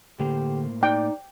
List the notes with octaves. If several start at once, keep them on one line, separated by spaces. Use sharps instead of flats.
A2 D3 A#3 G4 C5
D#4 D5 G5